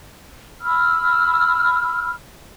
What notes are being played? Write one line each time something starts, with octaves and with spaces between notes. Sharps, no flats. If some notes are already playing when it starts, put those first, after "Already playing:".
B5 E6 F6